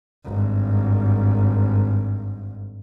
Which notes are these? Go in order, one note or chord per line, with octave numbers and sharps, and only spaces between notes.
G#1 G2